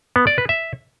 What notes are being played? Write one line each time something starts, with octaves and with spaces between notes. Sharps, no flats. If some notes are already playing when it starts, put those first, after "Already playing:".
B3
D5
B4
E5